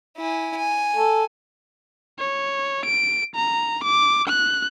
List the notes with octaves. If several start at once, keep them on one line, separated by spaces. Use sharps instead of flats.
E4 G#5
G#5
A4
C#5
D7
A#5
D6
F#6